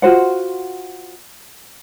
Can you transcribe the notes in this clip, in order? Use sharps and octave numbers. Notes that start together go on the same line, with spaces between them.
F4 F#4 C5 F#5